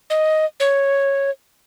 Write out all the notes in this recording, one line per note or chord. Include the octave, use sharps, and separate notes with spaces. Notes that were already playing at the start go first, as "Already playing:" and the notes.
D#5
C#5